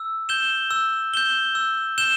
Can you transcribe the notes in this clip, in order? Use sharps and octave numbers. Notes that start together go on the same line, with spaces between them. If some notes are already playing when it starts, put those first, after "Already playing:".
Already playing: E6
G6 E7 G7
E6
G6 E7 G7
E6
G6 E7 G7